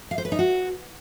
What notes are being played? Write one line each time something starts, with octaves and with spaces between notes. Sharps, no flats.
F5
C5
B4
D#4
F#4